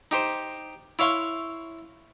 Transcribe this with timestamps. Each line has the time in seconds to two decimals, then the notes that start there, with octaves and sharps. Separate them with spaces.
0.11 D#4 G4 C5
0.99 E4 C#5 F5 C6 C#6